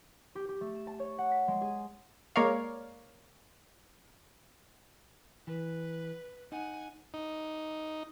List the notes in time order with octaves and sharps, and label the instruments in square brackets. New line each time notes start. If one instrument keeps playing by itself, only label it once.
[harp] G4
G4
A3
E7
A5
C#5
F#5
B6
G#3
G#4
[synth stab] G#3 A#3 A#4 C#5 D5 F5
[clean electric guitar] E3 [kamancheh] B4
[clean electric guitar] D#4 [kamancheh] F#5 G#5
[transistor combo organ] D#4